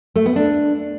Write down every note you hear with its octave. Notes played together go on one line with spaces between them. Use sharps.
A3
B3
D4